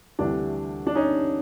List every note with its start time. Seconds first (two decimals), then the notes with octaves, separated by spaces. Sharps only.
0.19 D2 C3 E3 G3 D4
0.87 D4
0.95 C#4 D#4